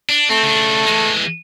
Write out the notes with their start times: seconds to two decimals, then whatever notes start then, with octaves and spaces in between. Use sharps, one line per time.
0.09 D4
0.30 A3 C4
0.43 C#3 D4
0.86 E3 G#3